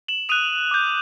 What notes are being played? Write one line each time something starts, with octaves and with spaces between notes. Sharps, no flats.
E7 F#7
D#6 F#6 D#7 F7
D6 G6